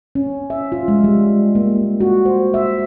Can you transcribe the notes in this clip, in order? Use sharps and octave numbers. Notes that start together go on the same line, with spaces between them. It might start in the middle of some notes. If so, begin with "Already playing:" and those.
C#4
E5
F4
G#3
G3
A#3
F#4
C5
E5